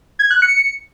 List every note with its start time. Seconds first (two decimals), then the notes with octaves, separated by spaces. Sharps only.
0.19 G#6
0.31 F#6
0.42 C#7